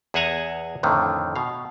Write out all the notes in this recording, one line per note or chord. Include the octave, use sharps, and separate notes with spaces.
E2 G#4 E5 F#5 G#5 A#5
F2 A2 D3 D#3
B2 F5